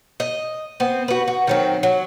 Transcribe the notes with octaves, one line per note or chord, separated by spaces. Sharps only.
D#5
B3 C4 C5
F#4 B4
F#4
D#3 F#3 C4
F#3